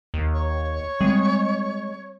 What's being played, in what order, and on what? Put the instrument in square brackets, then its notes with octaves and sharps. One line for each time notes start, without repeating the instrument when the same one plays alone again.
[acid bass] D#2
[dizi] C#5
[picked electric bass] G3 C4 [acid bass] G#3